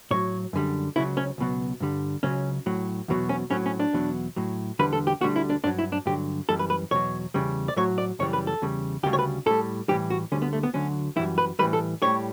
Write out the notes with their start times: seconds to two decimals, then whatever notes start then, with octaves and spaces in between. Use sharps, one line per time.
0.11 A2 F#3 C#5
0.53 F#2 D3 G3
0.96 C#2 C#3 F#3 E4
1.17 C#4
1.38 C#2 B2 F#3
1.80 G2 D3 G3
2.23 C#2 C#3 F#3 C#4
2.66 A2 F#3
3.08 E2 B2 F#3
3.29 C#4
3.51 A2 F#3 C#4
3.66 C#4
3.80 D4
3.93 E2 B2 F#3
4.36 A2 F#3
4.79 E2 D3 G3 B4
4.93 A4
5.07 G4
5.21 D2 D3 G3 F#4
5.36 E4
5.50 D4
5.64 G2 F#3 D4
5.79 E4
5.92 D4
6.06 G2 D3 F#3 G4
6.49 F#2 E3 G3 A4
6.59 B4
6.70 B4
6.91 E2 B2 F#3 C#5
7.34 E2 C#3 G3
7.68 D5
7.76 A2 F#3 C#5
7.98 D5
8.19 F#2 C#3 E3 G3 C#5
8.33 B4
8.47 A4
8.62 E2 C#3 G3
9.03 D2 C#3 G3 G4
9.13 C#5
9.19 B4
9.46 A2 G3 A4
9.88 A2 E3 G3 G4
10.10 F#4
10.32 D2 D3 G3 C#4
10.42 B3
10.53 A3
10.63 B3
10.74 D2 D3 F#3 C#4
11.16 F#2 E3 G3 E4
11.38 B4
11.59 A2 E3 G3 B4
11.73 A4
12.02 A2 G3 C#5